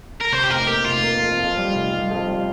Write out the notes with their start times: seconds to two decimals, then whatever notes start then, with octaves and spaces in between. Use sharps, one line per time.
0.21 A#4
0.32 C3 C5
0.43 G4
0.50 F1 A#4
0.68 A#3 G4
0.85 F1 F4
1.03 A#3
1.21 F2
1.40 F2
1.57 G3
1.74 F1
1.93 G3
2.11 F2
2.28 G3